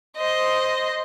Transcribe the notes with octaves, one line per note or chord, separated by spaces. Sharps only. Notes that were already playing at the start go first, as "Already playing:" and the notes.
C5 D#5